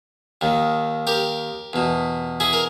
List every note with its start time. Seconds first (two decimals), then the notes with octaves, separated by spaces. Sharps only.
0.41 D#2 D#3
1.07 G4 A#4
1.73 E2 B2
2.40 E4 G#4
2.53 A#4